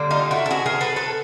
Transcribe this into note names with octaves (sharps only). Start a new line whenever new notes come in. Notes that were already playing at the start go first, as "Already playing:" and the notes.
Already playing: D3 G3 A#3
D#4 F4
E4 F#4
A4
F#4 G#4
G#4 A#4
A4 B4
A4 B4